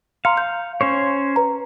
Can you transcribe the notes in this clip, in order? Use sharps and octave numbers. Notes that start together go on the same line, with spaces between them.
F5 A#5 C6 C#7
G6
C#4 C5 C#5
B4 A#5